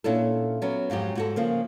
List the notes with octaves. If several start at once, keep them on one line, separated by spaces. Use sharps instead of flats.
A#2 C#4 D4 E4 A4
F#3 B3 C#4
F2 G#2 F#3 G4
G#2 F#4 A4
C#3 F3 A#3